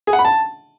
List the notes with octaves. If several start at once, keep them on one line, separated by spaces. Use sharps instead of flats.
G#4
F#5
B5
A5